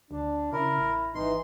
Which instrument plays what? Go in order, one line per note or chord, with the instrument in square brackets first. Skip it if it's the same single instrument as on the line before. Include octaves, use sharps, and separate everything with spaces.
[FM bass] D2 [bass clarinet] D4
[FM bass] C#3 [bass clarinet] E4 [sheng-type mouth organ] A#4
[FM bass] A1
[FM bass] G#1 [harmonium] E3 D#4 [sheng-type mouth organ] C6